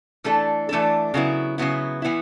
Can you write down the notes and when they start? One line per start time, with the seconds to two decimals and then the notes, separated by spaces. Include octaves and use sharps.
0.24 E3 A3 D4 A4
0.69 E3 A3 D4 A4
1.14 C#3 F#3 B3 E4
1.58 C#3 F#3 B3 E4
2.02 E3 B3 E4